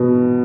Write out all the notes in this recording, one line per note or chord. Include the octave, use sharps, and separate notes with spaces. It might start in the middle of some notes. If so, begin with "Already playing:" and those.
Already playing: B2